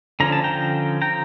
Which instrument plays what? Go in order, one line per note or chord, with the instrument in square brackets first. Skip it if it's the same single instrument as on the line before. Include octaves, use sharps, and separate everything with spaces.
[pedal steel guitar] D3 F3 C#4 A#5
A5
G5 A#5
G5 A#5